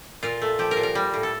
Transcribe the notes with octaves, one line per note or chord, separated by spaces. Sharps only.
A#2 F4
A3
F3 G4
A#4
A#2
A#4
G3
A2
A4